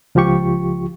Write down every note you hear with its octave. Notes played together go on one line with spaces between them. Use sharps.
C#2 F3 F4 G4 C#6